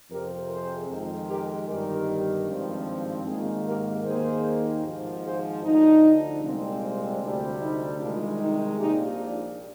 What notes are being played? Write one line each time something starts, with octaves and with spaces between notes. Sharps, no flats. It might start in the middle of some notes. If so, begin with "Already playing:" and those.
F2 C3 F3 C4 G4 A#4
G#4 C5
F2 D#3 G#3
G4 A#4
G1 G2 D#3 G3 G4 A#4
G#1 G2 F3 C4
G#1 G#2 D#3 A#3 F4 G#4
G4 A#4
D#2 D#3 A#3 G#4 C5
G#1 G#2 F3
G#4 C5
D2 D3 F3 D#4
C2 A#2 G#3 C4
D2 C3 G3 C4 D4
D#4
C2 C3 D#3 G#3 D4 F4
D#4
A#1 A#2 F3 D#4 G4
D4 F4